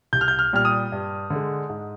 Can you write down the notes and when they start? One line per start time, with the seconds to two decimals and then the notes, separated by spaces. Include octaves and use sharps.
0.13 C2 G6
0.21 F6
0.28 G6
0.39 F6
0.53 A#2 G3 F6
0.65 D#6
0.92 G2
1.30 D3
1.36 G#3
1.69 G#2